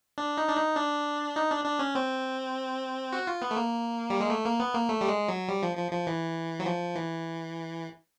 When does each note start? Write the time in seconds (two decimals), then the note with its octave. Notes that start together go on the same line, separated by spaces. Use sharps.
0.18 D4
0.38 D#4
0.49 D4
0.56 D#4
0.76 D4
1.36 D#4
1.51 D4
1.65 D4
1.79 C#4
1.95 C4
3.13 F#4
3.27 F4
3.42 B3
3.51 A3
3.57 A#3
4.10 G3
4.20 G#3
4.30 A3
4.45 A#3
4.60 B3
4.74 A#3
4.89 A3
5.01 G3
5.08 G#3
5.28 F#3
5.48 G3
5.63 F3
5.77 F3
5.92 F3
6.07 E3
6.60 F#3
6.66 F3
6.95 E3